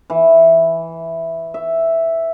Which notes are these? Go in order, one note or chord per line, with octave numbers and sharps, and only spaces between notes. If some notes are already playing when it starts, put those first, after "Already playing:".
E3
E5